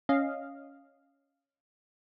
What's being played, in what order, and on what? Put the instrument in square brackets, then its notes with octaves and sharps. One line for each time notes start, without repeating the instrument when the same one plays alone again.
[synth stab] C#4 D#5 F5